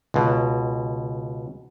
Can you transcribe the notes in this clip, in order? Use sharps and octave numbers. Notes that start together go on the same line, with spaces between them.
C#2 B2